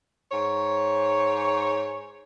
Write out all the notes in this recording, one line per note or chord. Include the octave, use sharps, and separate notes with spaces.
G#2 C#5